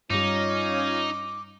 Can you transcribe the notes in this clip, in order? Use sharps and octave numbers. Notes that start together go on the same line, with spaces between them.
G2 G3 C#4 D#4 F4 D6